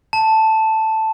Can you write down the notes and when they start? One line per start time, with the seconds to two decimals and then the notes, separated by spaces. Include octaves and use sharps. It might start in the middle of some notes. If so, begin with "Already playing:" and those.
0.13 A5